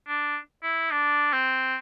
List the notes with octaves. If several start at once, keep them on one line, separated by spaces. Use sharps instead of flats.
D4
E4
D4
C4